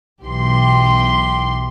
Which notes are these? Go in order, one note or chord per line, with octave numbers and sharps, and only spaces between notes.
B1 E3 G4 C6